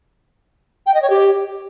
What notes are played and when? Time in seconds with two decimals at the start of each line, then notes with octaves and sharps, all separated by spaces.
0.86 G5
0.94 D#5
1.02 C#5
1.10 G4